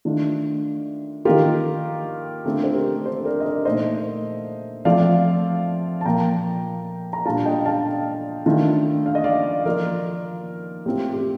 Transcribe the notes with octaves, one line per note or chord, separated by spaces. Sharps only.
D#3 A3 D4 F4
D#3 A#3 F4 G4 A#4
D3 A3 C4 F4 A4
C5
G4 A#4
A4 C5
A#4 D5
D#5
A#4 D5
A#2 A3 D#4 C5 D#5
F3 A3 C4 F4 D5 F5
A5
A#2 F3 A#3 G5 A#5
A#5
A#2 G3 D4 F4 F5 A5
D#5 G5
F5 A5
D#3 A3 D4 F4
F5
D#5
D5 F5
F3 A#3 F4 A#4 D5
A2 A3 C4 F4 G4
G4